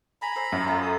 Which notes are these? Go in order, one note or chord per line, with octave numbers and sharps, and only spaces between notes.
G#5 A#5 B5
C5 E6
F#2
A3 F4 A#5
D#6